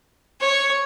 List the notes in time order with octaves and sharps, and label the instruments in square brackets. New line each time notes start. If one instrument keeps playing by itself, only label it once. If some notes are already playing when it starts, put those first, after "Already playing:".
[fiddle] C#5